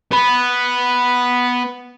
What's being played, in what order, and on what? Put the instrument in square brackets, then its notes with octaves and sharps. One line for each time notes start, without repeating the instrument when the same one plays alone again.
[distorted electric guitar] B3 B5